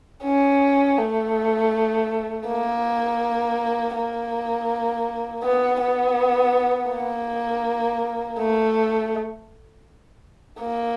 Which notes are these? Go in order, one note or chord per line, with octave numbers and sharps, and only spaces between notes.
C#4
A3
A#3
A#3
B3
B3
A#3
A3
A#3